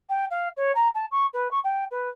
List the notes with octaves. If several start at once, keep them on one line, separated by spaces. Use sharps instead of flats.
G5
F5
C#5
A#5
A5
C#6
B4
C#6
G5
B4